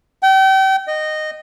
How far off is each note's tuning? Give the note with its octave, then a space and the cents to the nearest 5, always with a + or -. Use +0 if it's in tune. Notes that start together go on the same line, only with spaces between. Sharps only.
G5 -35
D#5 -15